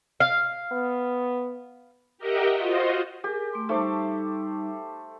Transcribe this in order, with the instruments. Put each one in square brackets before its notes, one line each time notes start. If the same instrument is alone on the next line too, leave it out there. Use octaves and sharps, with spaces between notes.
[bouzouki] F5
[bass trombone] B3
[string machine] G4 A#4 D#5 E5 F#5 G5
F4 F#4 C5 D#5
[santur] G4 [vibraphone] G#4 A#4 G#5
[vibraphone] A3 C6
[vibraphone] G3 D#4 [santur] A3 C5 D6